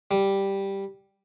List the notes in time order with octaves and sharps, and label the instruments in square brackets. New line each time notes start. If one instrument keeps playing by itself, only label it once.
[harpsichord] G3